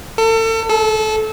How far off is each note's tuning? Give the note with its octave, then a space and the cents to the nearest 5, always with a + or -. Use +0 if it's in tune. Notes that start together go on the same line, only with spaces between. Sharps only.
A4 +35
A4 -25